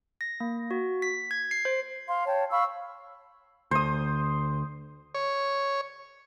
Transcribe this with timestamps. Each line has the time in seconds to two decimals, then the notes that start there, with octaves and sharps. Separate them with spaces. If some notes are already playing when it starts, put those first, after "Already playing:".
0.21 A#6
0.40 A#3
0.71 F#4
1.02 B6
1.31 G#6
1.51 C7
1.65 C5
2.08 F5 C6
2.26 C#5 G5 A5
2.51 F5 B5 C#6 E6
3.71 D2 C5 D#6
5.15 C#5